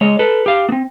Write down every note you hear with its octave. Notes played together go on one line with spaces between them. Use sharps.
G#3 C#5 D#5
A4 B4
G4 F5
B3 C4